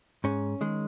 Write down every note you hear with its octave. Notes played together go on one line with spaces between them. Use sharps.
G#2 C#4
D#3 G#3